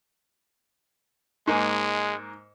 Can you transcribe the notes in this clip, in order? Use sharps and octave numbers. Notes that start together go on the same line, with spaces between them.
G#2 G#3 A#3 G#5